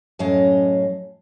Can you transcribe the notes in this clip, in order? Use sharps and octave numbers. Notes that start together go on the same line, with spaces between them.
F#2 A2 F#3 C#4 D#5 F5